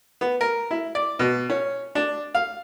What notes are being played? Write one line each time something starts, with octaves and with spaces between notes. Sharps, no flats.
B3
A#4
E4
D5
B2
C#4
D4
F5